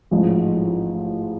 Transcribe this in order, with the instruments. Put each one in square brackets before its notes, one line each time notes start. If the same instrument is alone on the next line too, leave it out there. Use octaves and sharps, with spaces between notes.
[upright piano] A1 G#2 F3 G#3